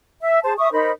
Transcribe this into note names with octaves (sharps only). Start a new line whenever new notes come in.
E5
G#4 C5 A5
E5 C#6 D#6
D#4 A#4 C5 B5